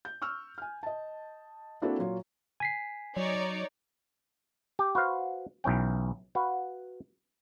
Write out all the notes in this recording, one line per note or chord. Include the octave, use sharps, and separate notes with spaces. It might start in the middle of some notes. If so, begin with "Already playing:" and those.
G6
C#6 E6 F6
G#5 F6
D#5 A5
A#3 C4 D4 E4 F#4 A4
A#2 F#3 F4 C#5
G#5 B6 C7
F#3 D#4 C#5 D5
G4
F#4 B4 C5 F5
B1 E3 C#4 G5
F#4 B4 F5 F#5